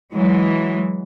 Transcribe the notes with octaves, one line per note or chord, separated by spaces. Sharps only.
E3 F#3 G#3